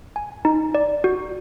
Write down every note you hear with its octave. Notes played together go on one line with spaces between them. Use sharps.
G#5
D#4
D5
F#4